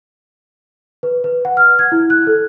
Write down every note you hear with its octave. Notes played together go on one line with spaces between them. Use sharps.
B4
B4
F#5
F6
G#6
E4
F#6
A4